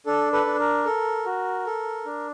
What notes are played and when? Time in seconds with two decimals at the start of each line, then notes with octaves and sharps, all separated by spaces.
0.06 D4 A4
0.32 A4 B4
0.46 D4
0.59 A#4
0.86 A4
1.26 F#4
1.66 A4
2.06 D4